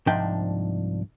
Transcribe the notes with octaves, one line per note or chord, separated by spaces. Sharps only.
C2 G#2 F3 D4 G5